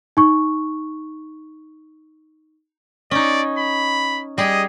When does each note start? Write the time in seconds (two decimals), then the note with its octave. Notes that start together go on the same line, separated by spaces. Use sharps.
0.17 D#4 C#6
3.11 C#4 D#4 D5
3.58 B5
4.38 G3 G#4 D#5